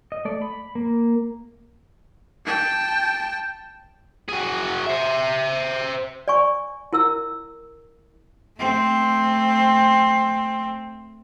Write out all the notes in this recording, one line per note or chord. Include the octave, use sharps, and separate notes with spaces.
D#5
A3 D5
B5
A#3
G5 A5
F#4 G#4
C5 E5
D5 G#5 C#6
E4 A#4 E6
A3 C4